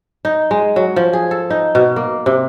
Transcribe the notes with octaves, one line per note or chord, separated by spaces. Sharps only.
D#4
G#3
F#3
F3
G#4
A4
D#4
B2
A#3
C3